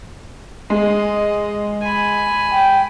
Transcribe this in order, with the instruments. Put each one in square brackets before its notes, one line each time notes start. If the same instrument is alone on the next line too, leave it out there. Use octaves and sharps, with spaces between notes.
[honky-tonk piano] G#3 [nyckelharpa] D#5
[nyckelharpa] G#5 B5
[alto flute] G5